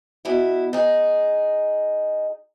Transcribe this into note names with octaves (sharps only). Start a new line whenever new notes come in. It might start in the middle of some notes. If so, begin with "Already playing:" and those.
B2 E4
D#4 G#4